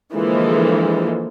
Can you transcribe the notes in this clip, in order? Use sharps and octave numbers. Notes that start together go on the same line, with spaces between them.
D3 E3 F3 G#3 A#3